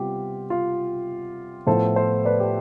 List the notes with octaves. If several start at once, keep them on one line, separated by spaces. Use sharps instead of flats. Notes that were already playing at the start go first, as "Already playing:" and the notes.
Already playing: C3 G3 B3 F4 G4
F4
A2 F3 B3 E4 A4 C5
A4 C5
B4 D5
G4